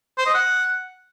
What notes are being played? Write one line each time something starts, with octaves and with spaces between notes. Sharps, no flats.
C5
D#5
F#5